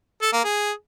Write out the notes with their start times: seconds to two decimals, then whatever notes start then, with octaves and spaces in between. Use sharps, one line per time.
0.22 A4
0.33 A#3
0.44 G#4